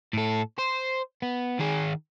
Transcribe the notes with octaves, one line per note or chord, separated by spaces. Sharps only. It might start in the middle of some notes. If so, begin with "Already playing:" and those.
A2 A4
C5
B3
D#3 G#4